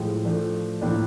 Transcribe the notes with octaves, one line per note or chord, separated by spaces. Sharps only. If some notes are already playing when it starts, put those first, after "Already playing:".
Already playing: A2 F3 G#3
F3 A3 D4
A2 F3 A#3 D4